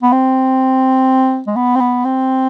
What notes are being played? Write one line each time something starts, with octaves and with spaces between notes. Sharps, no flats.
B3
C4
G#3
B3
C4
B3
C4